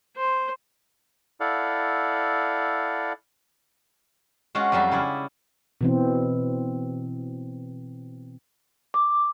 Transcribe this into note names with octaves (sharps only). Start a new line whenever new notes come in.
C5
E4 A4 D5 F5 F#5
G#3 C#4 F4 F#4
F2 F#3 G3 F4 E5
C#3 E4 D5
B2 E3 C4
D6